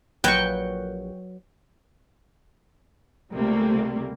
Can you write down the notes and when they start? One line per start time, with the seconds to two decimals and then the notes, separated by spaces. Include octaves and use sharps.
0.24 A#1 F#3 B4 G5 C#6
3.33 C#2 C3 G3 A3 A#3